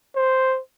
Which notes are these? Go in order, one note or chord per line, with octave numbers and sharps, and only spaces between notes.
C5